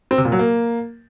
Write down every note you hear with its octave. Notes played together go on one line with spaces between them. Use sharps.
C4
C3
A#2
F#3
A#3